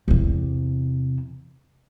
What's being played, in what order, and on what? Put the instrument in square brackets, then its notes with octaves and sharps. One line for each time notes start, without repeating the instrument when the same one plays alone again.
[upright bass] E2 C3